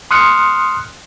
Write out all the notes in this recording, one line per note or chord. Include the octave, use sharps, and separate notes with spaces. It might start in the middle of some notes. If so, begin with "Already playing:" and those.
C6 D#6 F6 F#6 C#7